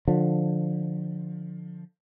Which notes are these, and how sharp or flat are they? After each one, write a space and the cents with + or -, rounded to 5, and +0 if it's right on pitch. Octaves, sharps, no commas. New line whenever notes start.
D3 +15 F3 +20